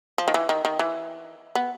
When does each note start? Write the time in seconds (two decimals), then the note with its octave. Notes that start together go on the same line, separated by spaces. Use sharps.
0.18 F3
0.28 D#3
0.34 E3
0.49 D#3
0.65 D#3
0.79 E3
1.55 B3